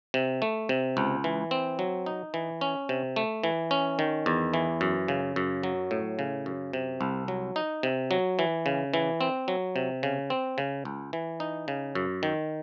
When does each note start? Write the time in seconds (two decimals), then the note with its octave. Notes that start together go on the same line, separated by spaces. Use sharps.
0.14 C3
0.42 A3
0.69 C3
0.97 C#2
1.24 E3
1.51 C4
1.79 F#3
2.06 D#4
2.34 E3
2.61 C#4
2.89 C3
3.16 A3
3.44 E3
3.71 C#4
3.99 D#3
4.26 E2
4.54 E3
4.81 F#2
5.08 C#3
5.36 F#2
5.63 F#3
5.91 A2
6.19 C#3
6.46 F#2
6.73 C3
7.01 C2
7.28 F#3
7.56 D#4
7.83 C3
8.11 F#3
8.39 E3
8.66 C#3
8.94 E3
9.21 C4
9.48 F#3
9.76 C3
10.03 C#3
10.30 C4
10.58 C#3
10.85 C#2
11.13 E3
11.40 D#4
11.68 C#3
11.95 F#2
12.23 D#3